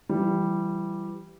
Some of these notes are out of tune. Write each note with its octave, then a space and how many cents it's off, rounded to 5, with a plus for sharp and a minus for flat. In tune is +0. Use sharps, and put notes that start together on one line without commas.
E3 +30 G3 -5